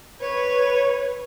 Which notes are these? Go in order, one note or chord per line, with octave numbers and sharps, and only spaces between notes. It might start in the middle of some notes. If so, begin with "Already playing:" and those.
B4 C#5